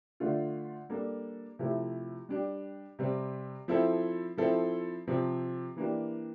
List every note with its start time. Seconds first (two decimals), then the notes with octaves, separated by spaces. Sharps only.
0.20 D3 A3 D4 F4
0.89 G3 A#3 D4 A4
1.59 C3 F3 A3 E4 G4
2.29 G3 D4 G4
2.99 C3 G3 C4
3.68 F3 C4 E4 A4
4.37 F3 C4 E4 A4
5.08 C3 F3 C4
5.77 E3 A#3 D4 G4